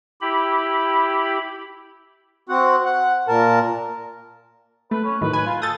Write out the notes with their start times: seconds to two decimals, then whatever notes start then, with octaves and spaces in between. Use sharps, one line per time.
0.21 E4 G4 B5
2.49 C4 F#4 F#5
2.85 F#5
3.28 A#2 A#4 A5
4.91 A3 B4
5.04 C#4
5.21 A2 D#3 F#3 B4
5.33 B4 G#5
5.46 F4
5.62 A4 D#6 G6 A6